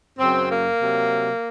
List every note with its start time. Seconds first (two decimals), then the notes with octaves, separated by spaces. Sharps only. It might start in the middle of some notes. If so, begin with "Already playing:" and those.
0.18 F#2 C#3 F#3 C4
0.48 A#3
0.80 C3 F#3